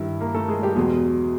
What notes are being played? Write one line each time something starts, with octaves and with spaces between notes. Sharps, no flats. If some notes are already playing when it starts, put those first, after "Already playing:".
Already playing: G2 D#3 G3 E4 E5
A#3 A#4
A3 A4
G#3 G#4
G3 G4
E2 B2 F#3 G#3 G#4